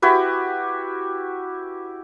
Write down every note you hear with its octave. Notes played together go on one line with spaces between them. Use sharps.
E4 F#4 G4 B4